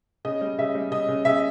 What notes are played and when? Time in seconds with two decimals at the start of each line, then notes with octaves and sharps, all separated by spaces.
0.25 C#3 D#5
0.41 G3
0.59 C#3 E5
0.75 G3
0.91 C#3 D#5
1.08 C#3
1.25 C#3 E5